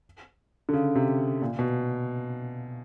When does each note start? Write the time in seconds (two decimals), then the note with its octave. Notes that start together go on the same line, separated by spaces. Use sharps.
0.69 D3
0.73 C#3
0.95 C3
1.42 A#2
1.59 B2